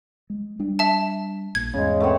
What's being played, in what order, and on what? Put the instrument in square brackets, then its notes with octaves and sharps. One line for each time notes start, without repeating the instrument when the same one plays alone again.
[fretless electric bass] G#3
G3 D4
[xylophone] E5 A5
[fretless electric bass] A#1 A#2 [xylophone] G#6
[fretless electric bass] E2 G#2 [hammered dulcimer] C#3 G#3
[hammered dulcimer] A3 B3 C4